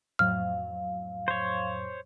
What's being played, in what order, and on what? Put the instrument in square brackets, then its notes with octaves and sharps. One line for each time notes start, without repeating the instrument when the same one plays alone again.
[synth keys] F2 A2 F#3 [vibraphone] F5 [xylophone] F6
[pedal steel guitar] C5 C#5